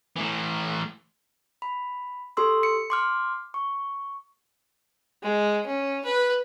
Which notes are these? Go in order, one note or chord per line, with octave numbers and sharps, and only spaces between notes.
A2 E3
B5
G4 A4 C6 E6
C#7
C6 D6 F6
C#6
G#3
C#4
B4